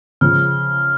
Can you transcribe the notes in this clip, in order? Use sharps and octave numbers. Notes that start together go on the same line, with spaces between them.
C#3 F3 F6